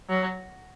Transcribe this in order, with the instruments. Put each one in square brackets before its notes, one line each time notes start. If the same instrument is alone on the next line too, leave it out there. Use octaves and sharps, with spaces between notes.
[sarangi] F#3